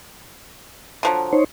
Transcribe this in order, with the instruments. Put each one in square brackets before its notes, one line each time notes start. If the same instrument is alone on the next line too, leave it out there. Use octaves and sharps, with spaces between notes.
[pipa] D3 F3 F#3
[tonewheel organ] D#4 C5 C#5